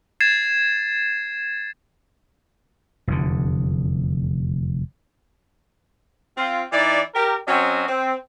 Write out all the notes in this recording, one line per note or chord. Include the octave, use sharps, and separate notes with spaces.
G#6 A6 C7 E7
F1 E2 D3
C4 F4
E3 D#4 D5
G4 A#4
F#3 C4 C#4 F#4 D#5
C4